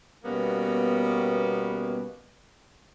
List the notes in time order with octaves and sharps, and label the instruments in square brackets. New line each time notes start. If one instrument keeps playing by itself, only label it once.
[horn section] B2 G3 A#3 B3 C#4